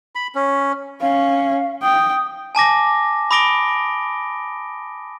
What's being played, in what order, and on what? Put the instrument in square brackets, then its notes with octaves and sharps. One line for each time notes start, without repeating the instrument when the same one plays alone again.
[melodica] B5
C#4
[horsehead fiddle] C#4 [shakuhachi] F5
[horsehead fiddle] G5 [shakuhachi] D#6
[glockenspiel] G#5 A5 D6 A#6
B5 D6 D#6 A#6 D7 G7